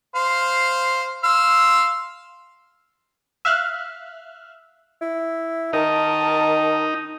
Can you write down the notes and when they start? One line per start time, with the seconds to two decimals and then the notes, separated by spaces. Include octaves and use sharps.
0.15 C5 F5
1.24 F5 C6 E6
3.45 E5 F5 F6 F#6
5.01 E4
5.73 D#3 D#4 A#4 A5